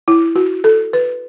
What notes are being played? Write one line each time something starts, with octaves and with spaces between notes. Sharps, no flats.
E4
F#4
A4
B4